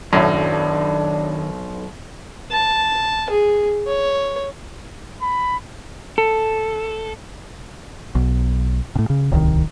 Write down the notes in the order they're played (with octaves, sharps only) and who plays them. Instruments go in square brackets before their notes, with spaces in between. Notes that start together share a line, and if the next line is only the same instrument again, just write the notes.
[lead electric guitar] B1 [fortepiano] F#2 A2 [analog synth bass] D#3 [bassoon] D4
[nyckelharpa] A5
G#4
C#5
[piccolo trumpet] B5
[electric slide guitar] A4
[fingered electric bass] B1
A2 C3
C#3
D1 C2 B2 D#3